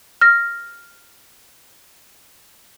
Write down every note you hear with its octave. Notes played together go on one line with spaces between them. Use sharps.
F6 A#6